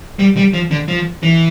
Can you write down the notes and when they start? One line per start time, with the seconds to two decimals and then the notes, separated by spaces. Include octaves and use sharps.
0.19 G3
0.37 G3
0.54 F3
0.71 D3
0.88 F3
1.23 E3